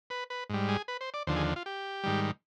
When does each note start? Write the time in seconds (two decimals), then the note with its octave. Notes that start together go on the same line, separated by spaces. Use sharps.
0.10 B4
0.30 B4
0.50 G#2 G3
0.69 G#4
0.88 B4
1.01 C5
1.14 D5
1.27 D#2 D3 F3 C5
1.36 G#4
1.56 F4
1.66 G4
2.04 G#2 D#3 G3